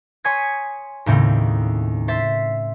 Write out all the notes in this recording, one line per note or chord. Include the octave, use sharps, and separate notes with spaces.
C#5 G#5 C6 D#6 G#6 B6
D#2 A2 C#3 C4 D#4
C5 E5 C6 A6 B6